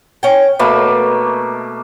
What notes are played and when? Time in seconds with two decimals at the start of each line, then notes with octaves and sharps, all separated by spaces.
0.23 C#4 G5
0.59 B2 A3 A#3 B4